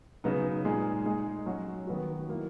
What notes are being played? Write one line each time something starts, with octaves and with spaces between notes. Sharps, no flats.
C#3 F#3 B3 D#4
A#2 G#3 D#4 G#4
G#3 D#4 G#4
F#3 C#4 F#4
D#3 F#3 B3 F#4
F#3 A#3 E4